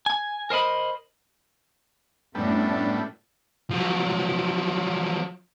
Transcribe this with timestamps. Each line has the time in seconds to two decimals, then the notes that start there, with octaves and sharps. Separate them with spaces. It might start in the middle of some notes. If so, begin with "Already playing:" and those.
0.06 G#5
0.50 A#4 C5 D#5 B5
2.35 F#2 A2 G3 A3 B3 D4
3.70 F3 F#3